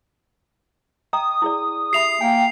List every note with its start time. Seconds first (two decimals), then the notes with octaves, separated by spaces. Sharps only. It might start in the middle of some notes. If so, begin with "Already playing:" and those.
1.13 D#5 G5 A#5 D#6
1.42 E4 G#4 D5
1.93 G4 E5 B5 C7 F7
2.21 A#3 G5 G#5